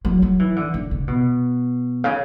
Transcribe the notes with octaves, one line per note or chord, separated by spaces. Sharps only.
F#3
F#3
E3
D3
D3
C#3
B2
C#3